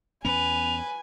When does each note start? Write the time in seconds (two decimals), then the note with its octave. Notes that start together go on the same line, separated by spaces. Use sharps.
0.25 E2 B3 C#4 B4 G#5 F7